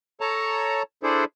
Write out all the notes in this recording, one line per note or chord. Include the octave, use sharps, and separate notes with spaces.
A4 C#5 A5 A#5
D4 E4 G#4 A4 C5 D5